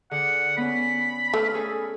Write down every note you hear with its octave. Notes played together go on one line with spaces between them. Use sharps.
D3 G#4 F#5
B3 C#4 B5
A3 A4 B4 F6
C#4 G#4 A4